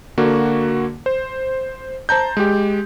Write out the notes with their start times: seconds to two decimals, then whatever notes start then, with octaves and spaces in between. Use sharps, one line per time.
0.18 D3 A#3 F#4
1.06 C5
2.09 C5 A5 A#5 G6
2.37 G#3 G4